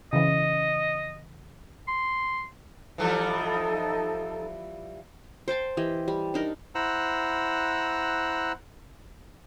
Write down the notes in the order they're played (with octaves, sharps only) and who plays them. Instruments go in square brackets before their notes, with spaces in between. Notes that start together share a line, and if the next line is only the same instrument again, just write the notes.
[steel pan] C#3 E3 [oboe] D#5
[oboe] C6
[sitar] E3 F3 G3 [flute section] D#4 A4
[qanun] C5 G5 A5 C6
E3 G4 D#5
G3
D4 D#4 A#4
[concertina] E4 C5 F#5 A#5 E6 F#6